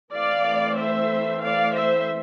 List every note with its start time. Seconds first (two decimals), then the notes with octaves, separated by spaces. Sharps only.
0.14 E3 A3 C4 D5 F5
0.78 C5 E5
1.42 D5 F5
1.75 C5 E5